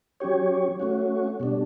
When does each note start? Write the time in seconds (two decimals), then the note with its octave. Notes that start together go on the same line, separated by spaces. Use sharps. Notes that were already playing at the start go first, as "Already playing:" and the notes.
0.20 F#3 C#4 G4 C#5
0.80 A3 C#4 F#4
1.40 B2 G3 D4